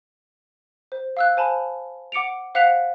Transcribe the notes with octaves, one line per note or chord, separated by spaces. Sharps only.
C5
F5 E6 F#6
C5 G#5 A5 B5
F#5 D6 C#7 D7 F7
C5 F5 F#5 F#6 B6 F7